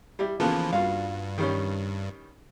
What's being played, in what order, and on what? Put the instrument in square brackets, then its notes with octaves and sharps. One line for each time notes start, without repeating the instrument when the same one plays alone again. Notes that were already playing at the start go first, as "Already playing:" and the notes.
[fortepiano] G3 [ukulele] E4 G4 E5
[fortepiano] C#3 A#3 B3 [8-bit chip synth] E3 F3 [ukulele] A4
[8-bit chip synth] G2 [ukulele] F4 F#4 F5
[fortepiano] D#3 G3 C#4